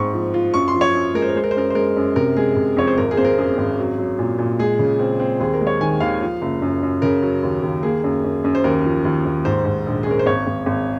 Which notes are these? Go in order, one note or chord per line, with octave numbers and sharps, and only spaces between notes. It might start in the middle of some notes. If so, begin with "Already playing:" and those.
Already playing: G#2 C4 C#6
F3
F4
F#2 C#6
C6
F3
C#5
F#2
G#3 A#4
C5
A#4
G#3 C5
A#4
C5
F#2 A#4
C5
G#3 A#4
F#2
C3 A#4
G#3 G#4
C3
F2 C#5
C5
G#1 A#4
G#4
G#1 C5
A#4
F#2 G#4
G#1
F#3
F#3
A#2
A#2
G#3 G#4
C#3
C4
C4
D#2 G#4
A#4
G#3
C#5
D#3 G#5
D#2 F5
F3
F#1
F#2
F#2
C#3 A#4
F#3
D#2
D#2
A#3 G#4
F#2
F#2
F#2
C5
D#2 A#4
F3
D#2
D#2
G#2 C5
G#2
A#1
G#4
C#4 A#4
C5
G#1 C#5
G#1
G#1